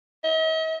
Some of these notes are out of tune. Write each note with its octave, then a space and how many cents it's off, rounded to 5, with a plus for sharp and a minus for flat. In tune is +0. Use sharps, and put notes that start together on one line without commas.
D#5 +45